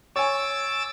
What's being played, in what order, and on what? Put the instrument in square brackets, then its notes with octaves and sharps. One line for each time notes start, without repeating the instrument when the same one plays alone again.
[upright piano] C#5 G#5 [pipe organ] D6 E6 A6